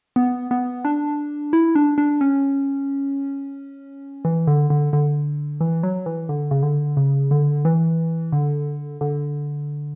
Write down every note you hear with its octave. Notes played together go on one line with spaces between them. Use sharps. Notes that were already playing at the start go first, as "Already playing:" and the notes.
B3
B3
D4
E4
D4
D4
C#4
E3
D3
D3
D3
E3
F#3
E3
D3
C#3
D3
C#3
D3
E3
D3
D3